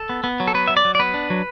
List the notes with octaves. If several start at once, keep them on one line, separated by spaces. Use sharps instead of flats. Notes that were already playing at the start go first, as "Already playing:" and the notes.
Already playing: A4
B3
B3
F#3
A4
B3 B4
F#3 E5
D5
F#3
D5
B3 B4
D4
F#3